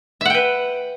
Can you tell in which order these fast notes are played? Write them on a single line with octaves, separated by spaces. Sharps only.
E5 F#5 G5 B4